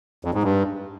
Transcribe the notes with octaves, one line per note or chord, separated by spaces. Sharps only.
F2
G#2
G2